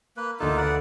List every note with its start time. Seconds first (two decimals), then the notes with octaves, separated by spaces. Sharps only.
0.17 A#3 B4
0.40 D2 A#3 D#4 F4 A4
0.57 B4 D5 F#5